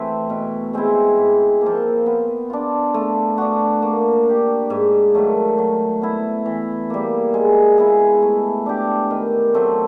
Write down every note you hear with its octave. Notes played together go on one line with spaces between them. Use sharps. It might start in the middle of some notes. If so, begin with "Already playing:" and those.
Already playing: E3 A3 C4
B2
G#3 C4 E4
G#2
F3 A#3
B3
D4 F4
A3
D4 F#4
A#3
D4 G4
G#2
D#3 F#3 A3
F#3
B3 E4
E3
G3 A#3
G#3
B3 E4 G#4
A3
D4 G4
D#3
F#3 A3 C4